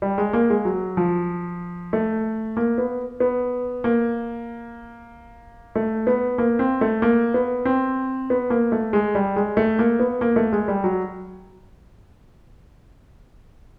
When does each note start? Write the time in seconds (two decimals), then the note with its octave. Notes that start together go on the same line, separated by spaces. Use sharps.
0.02 G3
0.18 G#3
0.33 A#3
0.50 G#3
0.65 F#3
0.97 F3
1.93 A3
2.57 A#3
2.78 B3
3.20 B3
3.84 A#3
5.76 A3
6.07 B3
6.38 A#3
6.59 C4
6.81 A3
7.02 A#3
7.34 B3
7.65 C4
8.30 B3
8.50 A#3
8.72 A3
8.93 G#3
9.15 G3
9.36 G#3
9.57 A3
9.79 A#3
9.99 B3
10.21 A#3
10.36 A3
10.52 G#3
10.68 G3
10.84 F#3